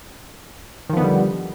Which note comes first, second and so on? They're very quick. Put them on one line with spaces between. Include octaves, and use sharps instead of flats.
D#3 F3 B3 D3 G3